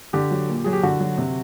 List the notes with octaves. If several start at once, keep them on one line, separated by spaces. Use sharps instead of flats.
D3 G4
F#3
A#2
F#3 G#4
G4
D3 F#4
F#3
C3